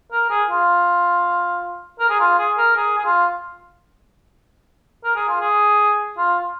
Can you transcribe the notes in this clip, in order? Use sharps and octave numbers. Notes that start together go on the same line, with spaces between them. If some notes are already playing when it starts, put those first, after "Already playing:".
A#4
G#4
F4
A#4
G#4
F4
G#4
A#4
G#4
G#4
F4
A#4
G#4
F4
G#4
F4